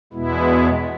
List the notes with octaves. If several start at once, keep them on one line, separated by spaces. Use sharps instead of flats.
E2 B2 G#3 B3 E4